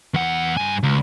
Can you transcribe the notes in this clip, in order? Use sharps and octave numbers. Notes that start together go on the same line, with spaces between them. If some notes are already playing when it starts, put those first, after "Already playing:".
E2 F#5
G2 G#5
C#2